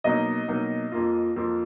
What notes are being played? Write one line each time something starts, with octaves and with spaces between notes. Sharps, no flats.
B2 F#3 A#3 D#4 D#5
B2 F#3 A#3 D#4
F2 F3 A#3 F4
F2 F3 A#3 F4